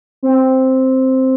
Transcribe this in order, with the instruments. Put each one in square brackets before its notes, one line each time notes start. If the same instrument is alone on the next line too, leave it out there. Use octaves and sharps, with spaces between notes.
[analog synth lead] C4